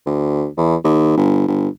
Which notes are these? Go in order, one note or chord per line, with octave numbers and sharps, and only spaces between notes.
D2
E2
D#2
G1
G1